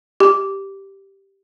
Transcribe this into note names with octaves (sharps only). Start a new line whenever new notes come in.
G4